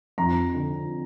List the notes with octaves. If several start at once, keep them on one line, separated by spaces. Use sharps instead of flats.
F2 A#5
D3